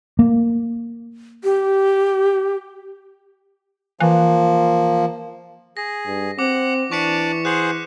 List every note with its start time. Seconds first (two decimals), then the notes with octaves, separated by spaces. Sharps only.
0.19 A#3
1.44 G4
4.00 E3 F3 A#3
5.77 G#4 A#6
6.06 G2
6.39 C4 F#5 D6
6.91 E3 D4 D5 C#6 D6 B6 C#7
7.45 G#4 C5 F#5 F#6